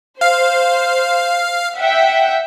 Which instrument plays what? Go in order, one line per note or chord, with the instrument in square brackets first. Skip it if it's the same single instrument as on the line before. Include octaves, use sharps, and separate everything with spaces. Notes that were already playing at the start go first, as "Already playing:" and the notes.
[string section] C5 [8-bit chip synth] F5
[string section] E5 F#5 G5